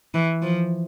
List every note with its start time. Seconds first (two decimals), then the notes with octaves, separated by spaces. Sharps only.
0.14 E3
0.42 F3